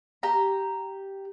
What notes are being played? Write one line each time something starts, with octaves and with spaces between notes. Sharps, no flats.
G4 A#5